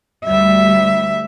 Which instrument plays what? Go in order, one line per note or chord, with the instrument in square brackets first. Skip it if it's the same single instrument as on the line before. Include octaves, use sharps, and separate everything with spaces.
[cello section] D2 G3 [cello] E5